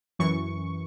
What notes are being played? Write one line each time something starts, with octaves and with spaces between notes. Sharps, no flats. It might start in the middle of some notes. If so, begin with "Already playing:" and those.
F#2 E3 C#6